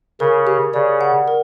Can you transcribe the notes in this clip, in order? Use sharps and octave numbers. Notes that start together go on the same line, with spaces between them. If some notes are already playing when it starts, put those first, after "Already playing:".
C#3 A#4
G4
C#3 D5
F#5
A#4